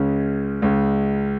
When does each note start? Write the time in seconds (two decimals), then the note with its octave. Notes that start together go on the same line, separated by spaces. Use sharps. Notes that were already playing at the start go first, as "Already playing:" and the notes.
Already playing: C#2 C#3 G#3 C#4
0.62 C#2 C#3 G#3 C#4